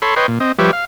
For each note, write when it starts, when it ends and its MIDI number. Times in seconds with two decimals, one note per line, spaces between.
0.02 0.15 69
0.02 0.15 73
0.02 0.15 83
0.02 0.15 84
0.16 0.27 71
0.16 0.27 73
0.16 0.27 75
0.16 0.27 79
0.16 0.27 84
0.28 0.39 46
0.40 0.52 60
0.40 0.52 75
0.59 0.71 53
0.59 0.71 55
0.59 0.71 67
0.59 0.71 71
0.59 0.71 73
0.59 0.71 76
0.73 0.85 77